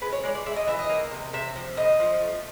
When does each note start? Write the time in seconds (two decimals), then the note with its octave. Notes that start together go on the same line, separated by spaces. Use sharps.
0.01 G#3 B4
0.13 C#5
0.24 G#3 D5
0.35 D5
0.46 G#3 E5
0.56 D#5
0.67 E3 E5
0.79 D#5
0.89 A#3
1.11 C3
1.33 C3 E5
1.56 F3
1.77 A2 D#5
2.00 F3
2.22 A3